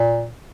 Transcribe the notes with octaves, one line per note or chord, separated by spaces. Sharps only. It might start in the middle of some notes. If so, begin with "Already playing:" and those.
Already playing: A#2